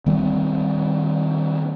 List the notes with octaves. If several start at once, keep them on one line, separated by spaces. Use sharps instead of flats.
D#3 G3 A#3 C4